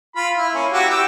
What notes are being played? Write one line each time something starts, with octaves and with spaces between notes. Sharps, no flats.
F4 B5
E4
A#3 C#4
E4 F#4 G4
G4 G5 E6